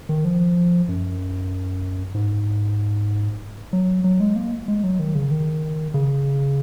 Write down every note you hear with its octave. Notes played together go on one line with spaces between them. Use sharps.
D#3
F3
F#2
G#2
F#3
F#3
G#3
A#3
G#3
F#3
D#3
C#3
D#3
C#3